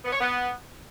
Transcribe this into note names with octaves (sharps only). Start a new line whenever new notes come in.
B3
C#5
B3